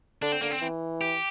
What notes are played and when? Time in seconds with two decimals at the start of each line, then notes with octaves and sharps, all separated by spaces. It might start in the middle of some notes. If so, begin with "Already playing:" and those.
0.22 D3 D4
0.32 C4
0.41 D3 A#3
0.51 C4
0.61 E3
1.01 G4